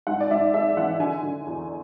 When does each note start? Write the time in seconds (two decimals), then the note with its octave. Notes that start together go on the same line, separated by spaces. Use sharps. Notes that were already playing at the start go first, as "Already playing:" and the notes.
0.07 G#2 F#5
0.21 D5
0.31 G#2 E5
0.54 G#3 E5
0.77 E3 F#5
1.00 D3 G#5
1.23 D3
1.47 E2